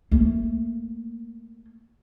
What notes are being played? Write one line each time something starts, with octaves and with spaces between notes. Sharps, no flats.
A3 A#3